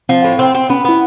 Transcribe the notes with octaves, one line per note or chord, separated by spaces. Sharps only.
F3 C4
A2
C4
C4
B3 C#4
B3 E4